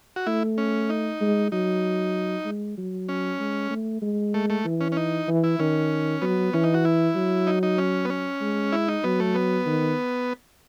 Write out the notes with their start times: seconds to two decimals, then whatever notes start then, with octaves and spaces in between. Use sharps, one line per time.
0.16 F#4
0.27 A3 E4
0.58 C#4
0.90 D#4
1.21 G#3
1.52 F#3 D#4
2.45 G#3
2.77 F#3
3.09 C#4
3.39 G#3
3.71 A3
4.02 G#3
4.34 A3
4.50 A3
4.65 E3
4.81 C#4
4.92 C#4
4.97 D#4
5.28 E3
5.44 E4
5.59 D#3 C#4
6.22 F#3 B3
6.53 E3 C#4
6.64 D#4
6.74 F#4
6.85 E4
7.16 F#3
7.47 D#4
7.63 D#4
7.78 C#4
8.05 B3
8.10 C#4
8.41 G#3
8.72 E4
8.88 D#4
9.04 F#3 B3
9.20 A3
9.35 B3
9.66 D#3